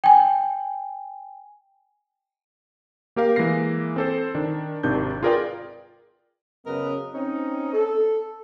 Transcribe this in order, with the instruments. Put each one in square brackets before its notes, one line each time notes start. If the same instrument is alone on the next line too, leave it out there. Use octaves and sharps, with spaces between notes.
[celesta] G5 G#5
[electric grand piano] A#3 G4 A#4 F5
E3 G#3 A#3 A#6 C7
C4 A4 C5
D#3 D4
G#1 C3 D#3 D4 G6
F4 G#4 A#4 B4 D5 G5
[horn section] F#2 C#3 B3 A#4 B4 D#5
C4 C#4 D#4
A4